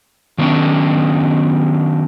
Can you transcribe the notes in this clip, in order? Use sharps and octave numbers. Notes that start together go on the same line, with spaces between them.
D#3 F#3 B3 C#4 D4